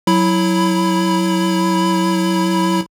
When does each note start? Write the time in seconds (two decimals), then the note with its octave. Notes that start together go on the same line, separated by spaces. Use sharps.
0.07 F#3 E4 B5